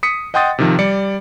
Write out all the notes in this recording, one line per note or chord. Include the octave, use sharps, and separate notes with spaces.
D#6 B6 C#7
D#5 F#5 G5 C6 D#6 A6
C3 D#3 F3
G3 D5 C#7